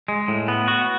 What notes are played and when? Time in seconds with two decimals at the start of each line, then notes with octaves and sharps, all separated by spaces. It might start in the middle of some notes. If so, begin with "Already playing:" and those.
0.08 G#3
0.28 A2
0.48 B3
0.68 F#4